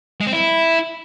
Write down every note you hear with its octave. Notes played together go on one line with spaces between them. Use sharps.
G#3
C4
E4